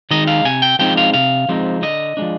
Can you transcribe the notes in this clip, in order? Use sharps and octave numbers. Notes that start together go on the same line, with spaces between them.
D#3 G#3 D#4 D#5
F5
C3 G#5
G5
F3 G#3 C4 D#4 G5
F5
C3 F5
F3 G#3 C4 D#4
D3 D#5
F3 G#3 D4